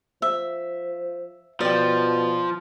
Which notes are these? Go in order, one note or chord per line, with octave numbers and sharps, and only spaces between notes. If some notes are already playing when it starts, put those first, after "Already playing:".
F3 E5
B2 F3 D5 G5